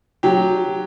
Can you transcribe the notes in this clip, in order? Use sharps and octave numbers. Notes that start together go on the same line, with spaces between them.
F#3 G4